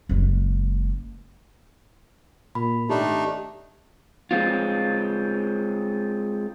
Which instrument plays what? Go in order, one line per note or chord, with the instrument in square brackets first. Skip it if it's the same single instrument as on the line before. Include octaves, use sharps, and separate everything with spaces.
[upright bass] F#1 G#3
[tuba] A#2 [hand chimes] B5
[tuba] G#1 [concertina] A3 D4 D#4 [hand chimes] G4
[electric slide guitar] G#3 C4 F4